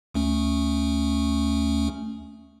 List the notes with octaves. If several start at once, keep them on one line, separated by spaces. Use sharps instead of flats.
D2 A3 C#4